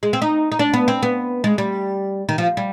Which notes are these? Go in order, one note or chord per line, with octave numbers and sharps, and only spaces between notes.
G#3
C4
D#4
D#4
D4
B3
C4
B3
G#3
G3
D#3
F3
G3